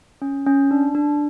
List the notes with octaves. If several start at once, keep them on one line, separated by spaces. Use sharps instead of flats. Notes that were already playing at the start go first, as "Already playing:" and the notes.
C#4
C#4
D4
D4